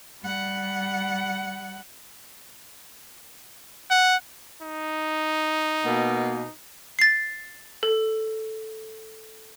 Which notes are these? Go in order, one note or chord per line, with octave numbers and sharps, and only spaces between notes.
G3 F#5
F#5
D#4
B2 A#3
A6 C7
A4